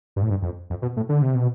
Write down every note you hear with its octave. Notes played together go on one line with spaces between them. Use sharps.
G2
A2
G2
F2
F2
B2
A2
D3
C3
B2